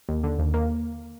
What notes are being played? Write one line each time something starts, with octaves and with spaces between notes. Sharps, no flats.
D#2
D3
D#2
A#3